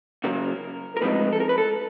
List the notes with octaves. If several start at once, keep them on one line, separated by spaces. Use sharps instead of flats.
C#3 F#3 A#3 A#4
A#4
A2 F3 G#3 C4 D#4 B4
A4
A#4
B4
A4